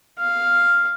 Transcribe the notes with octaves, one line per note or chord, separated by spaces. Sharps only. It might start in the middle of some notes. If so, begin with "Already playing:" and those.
F5